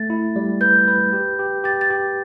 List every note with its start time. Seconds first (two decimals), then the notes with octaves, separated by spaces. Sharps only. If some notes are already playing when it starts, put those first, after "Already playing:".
Already playing: A3 A6
0.10 E4
0.36 G3
0.61 B4 G6
0.88 B4
1.13 G4
1.39 G4
1.64 G4 A6
1.81 A6
1.90 G4